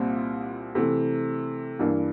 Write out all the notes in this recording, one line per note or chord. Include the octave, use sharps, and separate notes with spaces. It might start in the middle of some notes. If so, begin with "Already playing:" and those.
Already playing: C2 A#2 G3 C4 F4
C3 E3 A3
G2 E3 A#3 D4